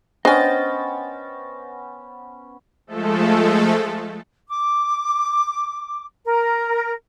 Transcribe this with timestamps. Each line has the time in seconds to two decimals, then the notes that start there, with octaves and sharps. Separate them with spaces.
0.25 B3 C#4 D4 C5 D#5 G5 G#5 A6
2.87 F3 G#3 A3 A4
4.49 D6
6.25 A#4